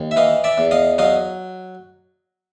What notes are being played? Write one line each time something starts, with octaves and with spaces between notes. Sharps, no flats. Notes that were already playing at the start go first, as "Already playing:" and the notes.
Already playing: D#2
E5
E3 D#5 F5
D5 E5
E2
D#5 F5
F#3 D#5 F5